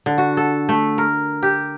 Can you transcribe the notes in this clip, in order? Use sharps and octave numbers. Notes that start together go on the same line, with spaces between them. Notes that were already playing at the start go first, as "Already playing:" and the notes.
D3
F#4
A4
A3
A#4
G4